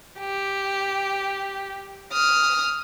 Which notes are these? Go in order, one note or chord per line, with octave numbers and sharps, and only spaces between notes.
G4
D#6 F6